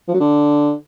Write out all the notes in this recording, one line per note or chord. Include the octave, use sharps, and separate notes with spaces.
F3
F#3
D3